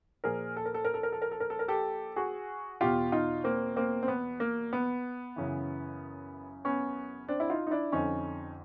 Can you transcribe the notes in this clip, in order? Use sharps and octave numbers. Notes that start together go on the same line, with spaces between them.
A#2 F3 G#4 A#4
A4
A#4
A4
A#4
A4
A#4
A4
A#4
A4
A#4
A4
A#4
G4 A4
F#4 G#4
E2 B2 F4 G4
D#4 F4
A#3 C4
A#3 C4
C4
B3
A#3
B3
F#2 C#3 E3
B3 C#4
C4 D4
E4
D#4 F4
D#4
D4 E4
F2 D3 F3 C#4 D#4